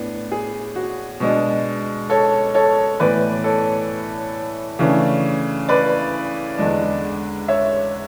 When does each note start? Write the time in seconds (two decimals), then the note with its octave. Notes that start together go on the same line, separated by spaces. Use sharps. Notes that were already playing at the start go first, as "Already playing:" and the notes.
Already playing: A2 B3 D4
0.32 G#4
0.76 F#4
1.20 B2 G#3 D4
2.10 A4 C#5
2.54 A4 C#5
3.00 A2 E3 B3 B4 D5
3.44 A4 C#5
4.79 C#3 E3 A3 D4
5.69 B4 D5
6.58 E2 D3 G#3 D4
7.48 C#5 E5